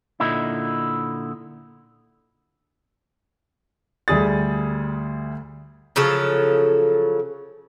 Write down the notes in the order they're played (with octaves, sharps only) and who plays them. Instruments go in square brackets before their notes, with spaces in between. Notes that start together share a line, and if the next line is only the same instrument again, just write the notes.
[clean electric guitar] A#2 D3 D#4 E4
[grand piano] D2 G3 G#4 D#6 A6
[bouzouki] C#3 F3 F#3 A4